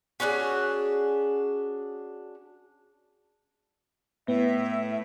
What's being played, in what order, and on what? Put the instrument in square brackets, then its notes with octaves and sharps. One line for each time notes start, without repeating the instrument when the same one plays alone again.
[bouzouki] C#4 D4 F#4 G#4
[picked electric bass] A2 [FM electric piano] B3 [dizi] E5